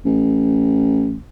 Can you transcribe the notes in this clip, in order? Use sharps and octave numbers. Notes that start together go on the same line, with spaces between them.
A1